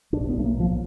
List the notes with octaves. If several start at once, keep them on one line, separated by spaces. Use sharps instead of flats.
B1 A2 D4
B3
A3
A#3
F3